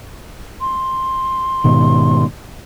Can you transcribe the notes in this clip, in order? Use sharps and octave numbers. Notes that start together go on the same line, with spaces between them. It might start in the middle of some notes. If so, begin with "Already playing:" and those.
C6
G#2 B2 D#3